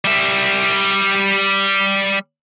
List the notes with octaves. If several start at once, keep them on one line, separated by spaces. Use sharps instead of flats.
G3 E5